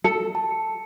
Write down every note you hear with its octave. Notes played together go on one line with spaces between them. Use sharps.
A4 C#7
A5